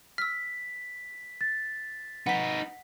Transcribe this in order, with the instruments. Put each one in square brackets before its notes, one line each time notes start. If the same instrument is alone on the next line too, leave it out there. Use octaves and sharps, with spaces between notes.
[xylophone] E6 F6 [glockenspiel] B6
[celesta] A6
[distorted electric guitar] D#4 B4 [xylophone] F#5 B6